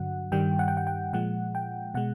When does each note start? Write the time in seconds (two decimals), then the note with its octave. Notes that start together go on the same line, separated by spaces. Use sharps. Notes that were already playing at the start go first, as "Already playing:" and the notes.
Already playing: G2 D3 F#3 F#5
0.32 G2 D#3 G3 G5
0.59 F#5
0.68 G5
0.77 F#5
0.87 G5
1.13 A#2 F3 G#3 F#5
1.55 G5
1.94 B2 G#3 F#5